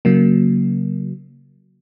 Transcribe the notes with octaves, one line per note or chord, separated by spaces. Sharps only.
C#3 F#3 A#3